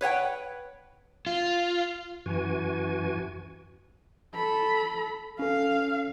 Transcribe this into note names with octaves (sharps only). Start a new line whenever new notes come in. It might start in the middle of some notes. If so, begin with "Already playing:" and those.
B4 C#5 F#5 G5
F4
F#2 E3 F#4 G#5
A4 B5
C#4 A4 F5